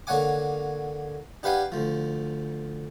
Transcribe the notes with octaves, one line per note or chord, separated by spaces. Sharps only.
D3 A#3 C#5 F#5 G#5 D6
D4 G4 B4 F5 F#5 G#5
D2 F3